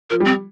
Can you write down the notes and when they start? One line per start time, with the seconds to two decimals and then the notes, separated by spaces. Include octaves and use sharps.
0.10 F3 A#4
0.20 G3 C4